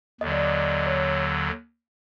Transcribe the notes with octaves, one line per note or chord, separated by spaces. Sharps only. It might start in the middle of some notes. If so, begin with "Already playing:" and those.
D#2 D3 F#3 D#5
D5
D#5
D5
C#5